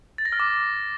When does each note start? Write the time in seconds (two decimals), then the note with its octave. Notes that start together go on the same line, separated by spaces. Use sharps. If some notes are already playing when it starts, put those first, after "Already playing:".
0.18 A6
0.25 A#6
0.32 F6
0.40 D6